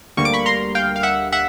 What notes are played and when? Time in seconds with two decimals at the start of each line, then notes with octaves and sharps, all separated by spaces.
0.17 D2 D3 G3 A#3 C#6
0.25 D6
0.33 B5 C#6
0.46 A#5 C6
0.75 F5 G5
0.96 F5
1.03 E5 F#5
1.32 E5 F#5